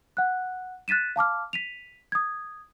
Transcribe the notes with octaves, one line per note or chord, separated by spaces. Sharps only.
F#5 F#6
F#6 A6 B6 D#7 E7
F5 A5 D6 F6
B6 D#7 F7
D#6 G#6